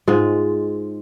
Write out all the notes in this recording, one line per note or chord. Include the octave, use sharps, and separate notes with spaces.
G#2 G#3 F4